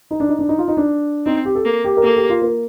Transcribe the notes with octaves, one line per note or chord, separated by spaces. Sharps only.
D#4
D4
D#4
D4
D#4
F4
D#4
D4
C4 D#4
G4
A4
A#3
G4
A#4
A#3 A4
G4
F4
A#3